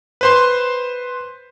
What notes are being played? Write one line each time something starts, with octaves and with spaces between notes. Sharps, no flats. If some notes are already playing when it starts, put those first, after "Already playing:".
B4 C5 C6